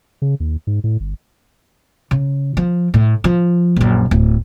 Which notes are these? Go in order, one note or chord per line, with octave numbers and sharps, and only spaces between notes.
C#3
D#2
G#2
A2
G1
C#3
F3
A2
F3
A#1 F#2
D1